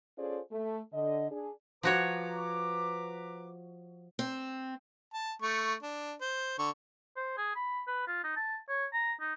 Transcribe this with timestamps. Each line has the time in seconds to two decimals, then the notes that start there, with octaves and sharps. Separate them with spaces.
0.17 C#4 F4 G#4 A4 C5 D5
0.52 A3
0.93 D3 D#5
1.29 D4 G#4
1.83 F3 F#4 B4 C#5 A#5 D6
4.19 C4
5.13 A5
5.42 A3 C#6
5.83 D4
6.21 C5
6.58 D3 C#6
7.17 C5
7.38 G#4
7.56 B5
7.87 B4
8.07 F4
8.24 D#4
8.36 A5
8.69 C#5
8.93 A#5
9.20 D#4